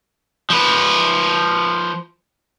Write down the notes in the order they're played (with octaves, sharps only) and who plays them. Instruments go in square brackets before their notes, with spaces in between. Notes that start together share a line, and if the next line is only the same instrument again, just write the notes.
[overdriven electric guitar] F3 B4